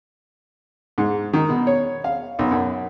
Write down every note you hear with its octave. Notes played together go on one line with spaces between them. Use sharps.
G#2
D#3
B2
C#5
F5
B1
F#2